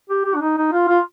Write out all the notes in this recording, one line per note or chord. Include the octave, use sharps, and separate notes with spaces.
G4
G4
D4
D#4
D#4
F4
F4